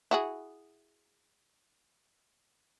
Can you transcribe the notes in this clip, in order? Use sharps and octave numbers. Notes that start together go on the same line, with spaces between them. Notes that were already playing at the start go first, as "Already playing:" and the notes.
E4 F#4 G#4